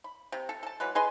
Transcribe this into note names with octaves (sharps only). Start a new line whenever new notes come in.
B5
C3
A4
A4 A5
E3 F#3 G#3 B4
G#4 B4 D#5 C6